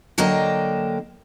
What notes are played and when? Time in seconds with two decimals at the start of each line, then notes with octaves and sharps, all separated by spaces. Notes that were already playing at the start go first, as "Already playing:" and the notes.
0.18 D3 F#3 A#3 D4 D#5 G5